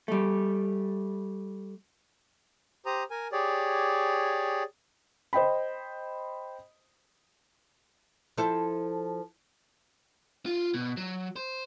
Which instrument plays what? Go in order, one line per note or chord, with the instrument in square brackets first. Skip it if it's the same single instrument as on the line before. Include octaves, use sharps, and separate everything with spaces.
[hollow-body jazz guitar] G3 A3
[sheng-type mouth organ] G4 C5 A#5 D#6
A#4 G#5
G4 G#4 C#5 D5
[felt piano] C5 D#5 G5 B5
[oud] F3 E4 A4
[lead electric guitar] F4
B2
F#3
C5